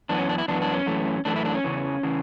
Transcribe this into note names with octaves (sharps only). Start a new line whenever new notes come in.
F#2 E3 B3 D4
C#4
D4
E4
F#2 E3 B3 D4
D4
C#4
F#2 E3 A3
F#2 E3 A3 D4
E4
D4
C#4
E2 C#3 E3
C#3 E3